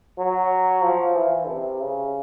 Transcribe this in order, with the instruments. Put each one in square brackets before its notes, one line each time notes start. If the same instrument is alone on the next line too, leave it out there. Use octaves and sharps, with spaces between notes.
[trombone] F#3
F3
E3
C3
C#3